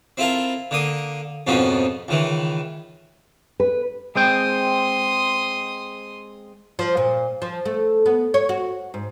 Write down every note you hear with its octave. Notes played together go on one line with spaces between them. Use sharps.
C4 E4 F4 A4 A#4
D3 A#3 D#6
F2 G#2 B2 F3 C#4 D#4
C#2 D#3 E3
B4
G#3 C4 G5 C6 D#6
F3
A#2
F3
A3
B3
C#5
F#4
G#2